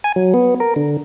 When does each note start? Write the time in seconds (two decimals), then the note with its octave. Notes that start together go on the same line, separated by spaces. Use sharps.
0.04 G#5
0.16 F#3
0.34 B3
0.60 A#4
0.76 D3